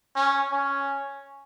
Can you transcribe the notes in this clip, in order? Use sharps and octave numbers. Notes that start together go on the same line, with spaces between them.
C#4
C#4